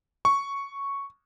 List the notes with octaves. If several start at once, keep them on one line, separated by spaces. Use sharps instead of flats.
C#6